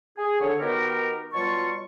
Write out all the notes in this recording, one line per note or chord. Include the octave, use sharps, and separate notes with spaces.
G#4
D3 C#5
D#3 B3 D#4 F#4 G4 A#4
B2 F#3 G3 F4 A5 C#6